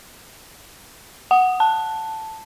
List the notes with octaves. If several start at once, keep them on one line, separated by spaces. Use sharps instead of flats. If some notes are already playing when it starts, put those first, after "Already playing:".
F#5
A5